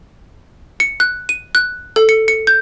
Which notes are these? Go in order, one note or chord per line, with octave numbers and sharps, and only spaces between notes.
C#7
F#6
D#7
F#6
A4
C#7
C#7
G6